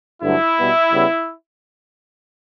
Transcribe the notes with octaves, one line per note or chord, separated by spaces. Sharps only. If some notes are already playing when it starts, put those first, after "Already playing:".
G2 D3 F#3 A3 E4
B2 G3 B3
C#3 G3 B3